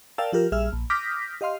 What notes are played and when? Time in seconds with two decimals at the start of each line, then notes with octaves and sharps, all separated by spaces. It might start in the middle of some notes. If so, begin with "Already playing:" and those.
0.18 A#4 D5 F5 G5 A5 E6
0.33 F3 F4 G4 A#4 F6
0.52 A#1 G3 G#4 E5 E6 F6
0.73 A#1
0.90 D6 D#6 F6 G6 A#6 B6
1.41 G4 D#5 F5 C6 F6